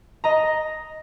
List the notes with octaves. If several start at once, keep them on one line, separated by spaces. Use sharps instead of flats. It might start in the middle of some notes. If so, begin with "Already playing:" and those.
D#5 A#5